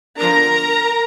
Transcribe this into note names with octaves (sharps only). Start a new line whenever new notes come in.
D3 F3 B3 D4 A#4 A#5